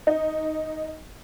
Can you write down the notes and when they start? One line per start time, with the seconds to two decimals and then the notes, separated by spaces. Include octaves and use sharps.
0.07 D#4